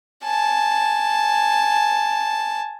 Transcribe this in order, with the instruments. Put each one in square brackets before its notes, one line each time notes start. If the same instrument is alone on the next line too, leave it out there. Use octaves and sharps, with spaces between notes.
[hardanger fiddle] G#5 A5